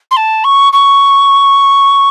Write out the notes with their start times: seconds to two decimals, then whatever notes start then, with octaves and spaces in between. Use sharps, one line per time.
0.11 C6
0.17 A5
0.44 C#6
0.73 C#6